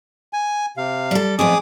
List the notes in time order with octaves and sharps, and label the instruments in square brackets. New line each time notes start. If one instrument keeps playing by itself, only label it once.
[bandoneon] G#5
C3 F5
[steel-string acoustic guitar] G3 A4
[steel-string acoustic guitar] F2 A2 B3 [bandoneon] G#4 D6 D#6